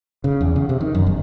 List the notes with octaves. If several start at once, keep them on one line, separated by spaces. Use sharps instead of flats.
C#3
E2
C#3
C3
D#3
F#2
G1